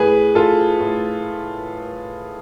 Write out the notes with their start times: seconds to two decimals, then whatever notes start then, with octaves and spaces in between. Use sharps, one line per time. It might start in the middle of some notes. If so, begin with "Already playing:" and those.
Already playing: A2 G#4 B4
0.35 A2 F4 A4
0.80 A2